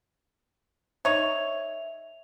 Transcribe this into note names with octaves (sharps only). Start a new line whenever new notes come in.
D#4 C#5 E5 F7